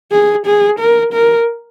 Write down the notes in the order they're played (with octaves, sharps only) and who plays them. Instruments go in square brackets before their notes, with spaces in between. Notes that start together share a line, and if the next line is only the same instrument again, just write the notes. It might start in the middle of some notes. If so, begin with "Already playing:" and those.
[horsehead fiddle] G#4
G#4
A#4
A#4